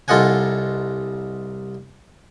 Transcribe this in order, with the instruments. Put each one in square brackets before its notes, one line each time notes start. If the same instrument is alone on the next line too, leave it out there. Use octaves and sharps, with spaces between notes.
[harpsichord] C2 F4 A4 D#5 F#5 G#5